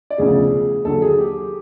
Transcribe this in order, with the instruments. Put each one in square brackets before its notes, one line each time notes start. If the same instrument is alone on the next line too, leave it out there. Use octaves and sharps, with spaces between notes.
[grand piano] D5
E1 D2 C#3 F3 G#4
D#2 D3 F#3 A4
G#4
G4